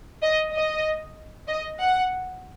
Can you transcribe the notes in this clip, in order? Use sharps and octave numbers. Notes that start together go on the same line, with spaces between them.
D#5
D#5
D#5
F#5